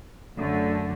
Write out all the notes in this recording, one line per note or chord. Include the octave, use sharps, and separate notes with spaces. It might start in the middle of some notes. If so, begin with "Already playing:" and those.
F#2 D3 A3